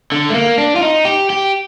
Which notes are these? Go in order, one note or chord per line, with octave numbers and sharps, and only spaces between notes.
D3
A3
A#3
D4
F4
D#4
G4
G4